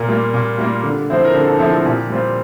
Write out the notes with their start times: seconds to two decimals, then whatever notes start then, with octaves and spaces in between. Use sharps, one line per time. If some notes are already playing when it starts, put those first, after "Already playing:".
Already playing: A#2 A#4
0.08 G3 A#3 F4
0.34 A#2
0.58 G3 A#3 F4
0.83 D3
1.10 F3 C4 E4 C5
1.24 A#4
1.34 D3 A4
1.48 A4
1.59 F3 C4 E4 A4
1.72 A4
1.85 A#2 G4
2.10 G3 C4 F4